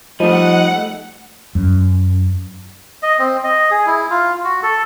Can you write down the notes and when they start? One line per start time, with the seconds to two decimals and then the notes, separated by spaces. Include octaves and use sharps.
0.20 F3 G3 A3 D#4 D#5 F#5
1.55 F#2
3.03 D#5
3.19 C4
3.43 D#5
3.71 G#4
3.86 E4
4.10 F4
4.44 F#4
4.63 A4